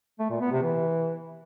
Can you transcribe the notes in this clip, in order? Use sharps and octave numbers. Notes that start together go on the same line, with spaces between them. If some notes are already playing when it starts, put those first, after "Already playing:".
A3
A#2
B3
C3
E3